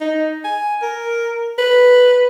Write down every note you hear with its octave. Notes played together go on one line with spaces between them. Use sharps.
D#4
G#5
A#4
B4